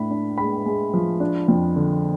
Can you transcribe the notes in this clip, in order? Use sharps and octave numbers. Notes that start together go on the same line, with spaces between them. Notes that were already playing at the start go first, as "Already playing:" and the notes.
Already playing: A2 D4 B5
D4
G#3 B5
G#3
F3
D4
F2
D3